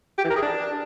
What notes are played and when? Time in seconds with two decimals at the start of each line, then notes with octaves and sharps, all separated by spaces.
0.18 G4
0.24 E3
0.30 A#4
0.36 G#4
0.42 D4